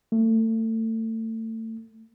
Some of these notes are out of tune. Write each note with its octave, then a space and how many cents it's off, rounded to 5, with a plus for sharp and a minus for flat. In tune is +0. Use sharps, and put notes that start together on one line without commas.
A3 +30